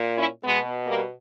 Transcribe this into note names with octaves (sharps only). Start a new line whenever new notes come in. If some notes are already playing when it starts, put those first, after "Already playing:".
Already playing: A#2
C#4 E4
B2 G#3 B3
G3 A#3